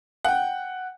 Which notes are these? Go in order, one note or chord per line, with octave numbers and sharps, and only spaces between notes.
F#5 G5